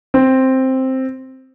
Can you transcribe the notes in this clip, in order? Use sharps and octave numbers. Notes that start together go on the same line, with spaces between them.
C4